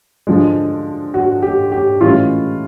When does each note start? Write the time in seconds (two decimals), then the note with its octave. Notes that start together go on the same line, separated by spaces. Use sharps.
0.27 D3 F3 G#3
1.14 F#4
1.42 G4
1.72 G4
2.01 A2 E3 G#3 C#4 F4